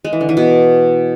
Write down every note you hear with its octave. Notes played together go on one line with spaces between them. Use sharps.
G#3
E3
D3
E3
B2